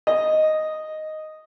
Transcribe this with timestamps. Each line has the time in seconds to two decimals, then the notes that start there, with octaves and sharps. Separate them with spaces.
0.07 D#5